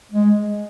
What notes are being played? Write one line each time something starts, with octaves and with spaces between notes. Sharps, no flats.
G#3